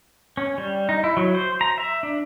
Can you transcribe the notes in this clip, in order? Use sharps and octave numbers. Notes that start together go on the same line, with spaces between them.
C#4
G3
D#4
E4
F#3
C5
A#5
E5
D4